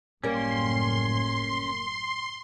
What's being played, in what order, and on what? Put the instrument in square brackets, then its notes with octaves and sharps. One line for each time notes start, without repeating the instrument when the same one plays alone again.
[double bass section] F#1 A2 [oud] G3 A#3 [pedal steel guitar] C#4 [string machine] C6